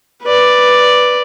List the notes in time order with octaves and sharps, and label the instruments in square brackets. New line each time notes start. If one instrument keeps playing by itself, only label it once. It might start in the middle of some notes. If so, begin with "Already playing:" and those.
[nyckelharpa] B4 D5